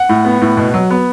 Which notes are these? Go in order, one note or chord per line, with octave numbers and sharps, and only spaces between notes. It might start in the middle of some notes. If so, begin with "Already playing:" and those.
Already playing: F#5
A2
B3
A2
B2
F#3
B3